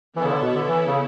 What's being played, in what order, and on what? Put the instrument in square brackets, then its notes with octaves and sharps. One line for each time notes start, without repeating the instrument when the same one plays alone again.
[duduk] E3 [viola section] B3 E4 A4 C#5
[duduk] C#3
D3
B2
D3
E3
C#3